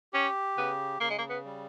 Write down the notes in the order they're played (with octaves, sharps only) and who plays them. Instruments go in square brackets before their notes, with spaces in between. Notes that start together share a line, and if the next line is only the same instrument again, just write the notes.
[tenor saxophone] C#4 [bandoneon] G4
[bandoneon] C#3 [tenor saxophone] B3
[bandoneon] C#3 [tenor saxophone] A#3
[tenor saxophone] G#3
A#3
B3
[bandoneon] G3